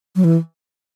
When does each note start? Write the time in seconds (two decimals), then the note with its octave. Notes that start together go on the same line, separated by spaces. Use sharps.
0.16 F#3
0.24 E3